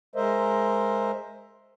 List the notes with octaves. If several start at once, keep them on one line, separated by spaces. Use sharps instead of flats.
G#3 A#4 C5 D#5 E5